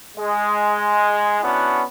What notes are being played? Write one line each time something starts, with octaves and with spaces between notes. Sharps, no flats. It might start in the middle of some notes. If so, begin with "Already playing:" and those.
G#3
B3 C#4 D4 E4 F#4